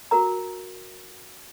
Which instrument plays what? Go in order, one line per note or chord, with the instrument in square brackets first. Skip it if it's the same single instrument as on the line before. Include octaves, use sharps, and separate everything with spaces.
[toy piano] F#4 A#4 A#5